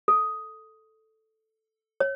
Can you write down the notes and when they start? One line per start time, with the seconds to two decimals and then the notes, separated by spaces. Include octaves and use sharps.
0.08 A4
2.00 C#5